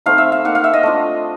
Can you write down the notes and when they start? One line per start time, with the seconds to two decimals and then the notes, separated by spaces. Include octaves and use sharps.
0.06 A3 C4 D#4 F5
0.18 E5
0.32 F5
0.45 A#3 D#4 F#5
0.55 F5
0.64 E5
0.73 D#5
0.83 A3 D4 F4